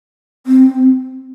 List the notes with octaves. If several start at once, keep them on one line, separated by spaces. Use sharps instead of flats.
C4